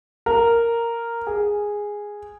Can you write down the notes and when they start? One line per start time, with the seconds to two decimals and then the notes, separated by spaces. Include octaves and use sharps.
0.26 A#4
1.27 G#4